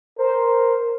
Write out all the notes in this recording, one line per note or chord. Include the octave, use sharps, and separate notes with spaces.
A#4 C5